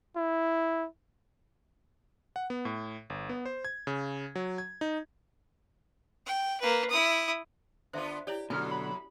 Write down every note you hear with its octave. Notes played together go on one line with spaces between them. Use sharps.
E4
F#5
B3
A2
G1
B3
C5
G#6
C#3
F#3
G#6
D#4
G5
A#3 B4
E4 D#6
D3 B3 F4 C5 E5
E4 G4 C#5 D5
F#2 B2 D3 F#3 G#5 F6
B5